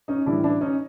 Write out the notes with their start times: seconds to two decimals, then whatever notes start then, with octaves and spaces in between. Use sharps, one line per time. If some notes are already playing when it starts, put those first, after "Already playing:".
0.08 C#4 D#4
0.26 A2 E3 G3 D4 E4
0.44 D4 E4
0.61 C#4 D#4